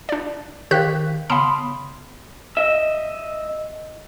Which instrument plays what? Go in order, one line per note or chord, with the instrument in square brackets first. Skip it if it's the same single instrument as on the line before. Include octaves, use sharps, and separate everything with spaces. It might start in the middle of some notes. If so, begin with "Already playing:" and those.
[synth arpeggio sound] D4 D5
[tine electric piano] D#3 B6 [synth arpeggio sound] G4 C5 F#6 [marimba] F5 G5 C#6
[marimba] C#3 B3 [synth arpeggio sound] F5 A5 [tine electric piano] B5 C6 D#6
[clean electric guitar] D#5 E5